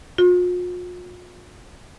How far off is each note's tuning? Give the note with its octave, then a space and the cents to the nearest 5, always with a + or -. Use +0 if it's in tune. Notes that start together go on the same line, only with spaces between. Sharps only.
F4 +45